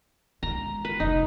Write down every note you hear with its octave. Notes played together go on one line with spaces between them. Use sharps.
G#3 A#5
B4
F1 D#4